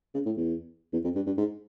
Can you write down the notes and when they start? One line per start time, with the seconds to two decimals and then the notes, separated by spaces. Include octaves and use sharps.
0.14 C#3
0.26 A2
0.37 E2
0.93 E2
1.04 F2
1.15 G2
1.26 G2
1.37 G#2